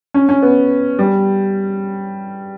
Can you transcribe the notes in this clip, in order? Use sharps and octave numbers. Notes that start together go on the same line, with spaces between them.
C#4
C#4
B3
G3